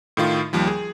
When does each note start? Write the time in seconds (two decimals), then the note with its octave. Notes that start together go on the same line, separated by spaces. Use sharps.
0.17 A2 D#3 F4
0.53 D#2 F3 G3
0.68 G#4